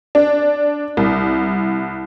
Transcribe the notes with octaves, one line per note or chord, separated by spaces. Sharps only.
D4
C2